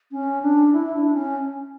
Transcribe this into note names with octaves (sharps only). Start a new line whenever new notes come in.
C#4
D4
E4
D4
C#4